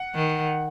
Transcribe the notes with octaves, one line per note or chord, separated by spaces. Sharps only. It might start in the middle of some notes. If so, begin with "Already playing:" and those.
Already playing: F#5
D#3